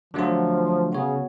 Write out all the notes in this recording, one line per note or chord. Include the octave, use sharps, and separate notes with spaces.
D3 F3 F#3 A3 F4
C#3 B3 F#4 C#5